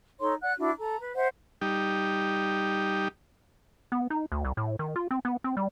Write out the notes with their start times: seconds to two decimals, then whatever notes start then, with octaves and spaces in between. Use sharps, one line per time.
0.20 D#4 A4 C#5 C6
0.41 D5 F#5 F#6
0.58 D4 E4 F#4
0.78 A4 A#5
1.00 B4
1.15 C5 E5 F#5
1.61 G3 D#4 G4
3.92 B3
4.10 D#4
4.32 D2
4.45 C2
4.57 A2
4.79 D#3
4.96 F4
5.11 C4
5.25 B3
5.44 C4
5.57 G3